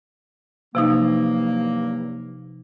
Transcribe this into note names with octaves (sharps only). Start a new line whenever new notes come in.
G2 C3 F3 F#3 A#3 D#4